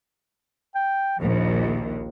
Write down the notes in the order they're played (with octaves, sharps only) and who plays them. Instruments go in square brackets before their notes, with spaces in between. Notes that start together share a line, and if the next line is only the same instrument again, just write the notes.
[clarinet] G5
[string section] A#1 D#2 [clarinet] F3